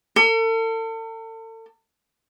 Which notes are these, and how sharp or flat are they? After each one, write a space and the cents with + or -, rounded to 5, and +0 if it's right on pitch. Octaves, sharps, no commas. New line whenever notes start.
A4 +40